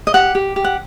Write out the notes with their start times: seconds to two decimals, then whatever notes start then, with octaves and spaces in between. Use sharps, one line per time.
0.07 D#5
0.14 G4 F#5
0.35 G4
0.56 G4
0.64 F#5